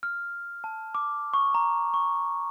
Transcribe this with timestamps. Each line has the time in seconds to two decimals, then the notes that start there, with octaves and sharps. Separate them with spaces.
0.03 F6
0.64 A5
0.95 D6
1.34 C#6
1.55 A#5
1.94 C#6